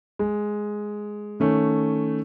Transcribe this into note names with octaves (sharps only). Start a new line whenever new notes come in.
G#3
D#3 A3 C#4